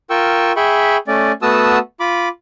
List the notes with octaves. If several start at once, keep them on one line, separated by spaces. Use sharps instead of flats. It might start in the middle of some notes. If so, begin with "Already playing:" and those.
F4 A#4 G5 C#6 E6
G#4 E5 G5 B5 C#6
A3 C#4 D5
A3 B3 F#4 A5 D#6 E6
F4 B5 D6